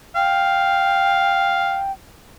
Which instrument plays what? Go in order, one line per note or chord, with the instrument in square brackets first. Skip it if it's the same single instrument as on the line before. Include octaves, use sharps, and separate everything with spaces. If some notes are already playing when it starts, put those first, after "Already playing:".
[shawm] F5 [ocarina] G5